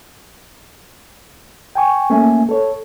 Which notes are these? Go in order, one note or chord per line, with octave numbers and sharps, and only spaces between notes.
G5 G#5 C#6
A3 A#3 C#4 E5 G#5
A4 C#5